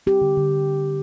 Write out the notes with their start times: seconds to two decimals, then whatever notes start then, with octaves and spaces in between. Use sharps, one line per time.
0.07 C4 G4
0.21 D3
0.37 D3